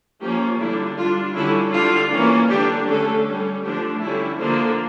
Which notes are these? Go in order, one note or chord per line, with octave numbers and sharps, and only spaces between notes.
F3 A#3 C#4 G4
D3 G3 D4 E4
G3 D4 F4
D3 G3 C#4 E4
D3 G3 D4 F4
E3 A#3 C#4
D3 G3 D4 G4
D3 A3 C#4 A4
G3 C#4
D3 F3 A3 D4 G4
D3 G3 C#4 E4
D3 F3 A#3 D4